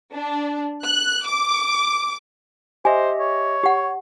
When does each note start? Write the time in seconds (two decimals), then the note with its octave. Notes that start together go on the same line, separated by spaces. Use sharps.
0.13 D4
0.84 F#6
1.26 D6
2.85 G4 C5 D#5 E5 G#5
3.19 C#5
3.64 G4 F#5